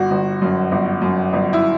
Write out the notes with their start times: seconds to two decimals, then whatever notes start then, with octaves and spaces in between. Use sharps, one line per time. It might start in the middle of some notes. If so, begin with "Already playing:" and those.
Already playing: G1 F#4
0.11 G1
0.42 F#2
0.72 G1
1.02 F#2
1.33 G1
1.53 E4